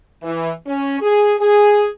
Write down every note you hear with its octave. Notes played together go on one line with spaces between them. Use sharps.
E3
C#4
G#4
G#4